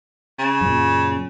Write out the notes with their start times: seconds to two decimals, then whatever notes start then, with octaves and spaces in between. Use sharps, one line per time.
0.39 C#3
0.61 F#2 A#2